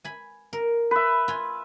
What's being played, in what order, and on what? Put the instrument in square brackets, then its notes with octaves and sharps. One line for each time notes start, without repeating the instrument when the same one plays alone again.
[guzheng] G#5 B5
A#4
[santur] B4 E5
[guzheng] F4 G#5